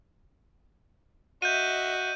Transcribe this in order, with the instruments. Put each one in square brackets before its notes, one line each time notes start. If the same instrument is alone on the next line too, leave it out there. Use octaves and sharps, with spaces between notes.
[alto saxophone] F#4 [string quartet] D#5 E5 [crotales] G6 D#7